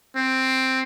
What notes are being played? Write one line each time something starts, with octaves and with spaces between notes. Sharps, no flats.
C4